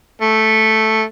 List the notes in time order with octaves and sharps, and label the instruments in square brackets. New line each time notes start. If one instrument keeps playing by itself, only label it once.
[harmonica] A3